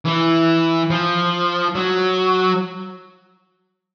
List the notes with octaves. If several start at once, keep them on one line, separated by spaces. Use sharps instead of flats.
E3
F3
F#3